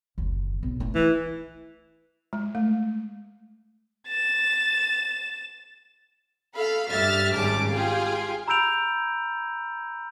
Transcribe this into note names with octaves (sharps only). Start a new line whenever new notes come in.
F#1 D#2
B1
A3 D#4
E3
G#3
A3
A6 E7
A4 F5 B5
G2 G3 E5 F6 A6 B6
G#1 C#3 G3 G#4 A5 D6
F4 G4 G#4 F5 G5
A#5 B5 E6 G6 D7 F7